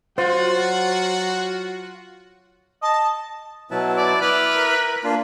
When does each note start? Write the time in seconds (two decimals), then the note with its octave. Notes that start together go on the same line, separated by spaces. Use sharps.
0.18 F#3 F4 F#4 C5 F#5
2.82 D#5 A5
3.71 B2 F#3 E4 B4 A5
3.97 D5
4.21 E4 B4 B5 D6 F6
4.55 A#4
5.04 A#3 D4 F4